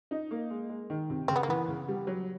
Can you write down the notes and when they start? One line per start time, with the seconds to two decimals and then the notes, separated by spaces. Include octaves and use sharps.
0.11 D#4
0.31 A#3
0.50 G#3
0.69 G#3
0.90 D#3
1.10 C3
1.28 C#3 C4
1.36 B3
1.43 A#3
1.48 E3 B3
1.68 C#3
1.88 G3
2.07 F#3